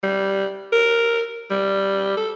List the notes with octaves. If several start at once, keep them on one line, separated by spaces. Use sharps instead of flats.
G3
A#4
G3
A4